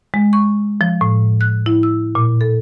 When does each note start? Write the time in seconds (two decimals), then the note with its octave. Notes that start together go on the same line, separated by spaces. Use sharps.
0.14 G#3
0.33 C#6
0.81 F3
1.01 A2
1.41 F#6
1.66 E4
1.83 E6
2.15 A#2
2.41 A4